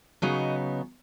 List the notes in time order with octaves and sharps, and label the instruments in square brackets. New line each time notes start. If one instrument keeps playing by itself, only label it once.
[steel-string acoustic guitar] C#3 F#3 B3 D#4 D#5